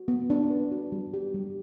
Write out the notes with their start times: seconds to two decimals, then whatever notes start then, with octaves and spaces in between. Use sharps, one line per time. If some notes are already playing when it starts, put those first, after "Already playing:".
Already playing: F#4
0.08 B3
0.30 D4
0.50 B4
0.72 F#4
0.92 G3
1.14 G4
1.34 G3